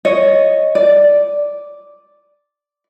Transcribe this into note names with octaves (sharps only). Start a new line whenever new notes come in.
C#5 D#5
D5